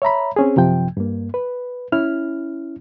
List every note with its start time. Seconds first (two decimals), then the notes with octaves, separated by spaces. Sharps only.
0.02 C#5 E5 A#5 B5
0.36 C4 C#4 G#4
0.56 F#2 C3 F3 G5
0.97 G2 A#3
1.34 B4
1.92 C#4 E4 F6